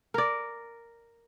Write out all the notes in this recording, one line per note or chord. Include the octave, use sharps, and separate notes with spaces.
A#4 D5